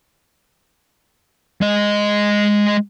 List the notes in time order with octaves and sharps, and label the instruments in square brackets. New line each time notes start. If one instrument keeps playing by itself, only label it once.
[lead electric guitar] G#3 D#5